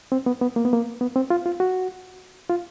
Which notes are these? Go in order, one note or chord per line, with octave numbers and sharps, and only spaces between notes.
C4
B3
B3
A#3
B3
A#3
B3
C4
F4
F4
F#4
F4